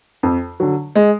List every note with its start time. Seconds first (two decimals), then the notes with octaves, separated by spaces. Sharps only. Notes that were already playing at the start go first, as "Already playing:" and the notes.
0.23 F2
0.60 D3 F#3
0.95 G#3